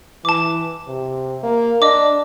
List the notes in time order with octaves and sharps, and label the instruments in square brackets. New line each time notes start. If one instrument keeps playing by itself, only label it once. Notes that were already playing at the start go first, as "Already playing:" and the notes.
[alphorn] E3 [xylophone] A5 D6
[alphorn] C3
A#3
[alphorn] D4 [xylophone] D#5 D6